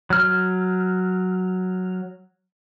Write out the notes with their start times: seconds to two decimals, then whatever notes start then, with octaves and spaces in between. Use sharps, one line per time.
0.10 F#3 F6